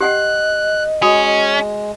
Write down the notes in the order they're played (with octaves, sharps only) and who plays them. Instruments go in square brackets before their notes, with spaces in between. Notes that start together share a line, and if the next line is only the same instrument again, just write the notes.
[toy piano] G4 F#5 G5 [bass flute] D#5 [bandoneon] F#6
[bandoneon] G#3 [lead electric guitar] C#4 [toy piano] F#4 D#6